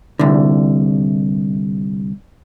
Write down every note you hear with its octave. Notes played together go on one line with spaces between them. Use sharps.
C2 D3